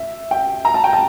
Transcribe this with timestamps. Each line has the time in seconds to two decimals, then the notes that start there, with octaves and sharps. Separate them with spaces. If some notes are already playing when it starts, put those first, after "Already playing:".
Already playing: E5
0.31 G5
0.65 A#5
0.74 A5
0.84 G5
0.93 A5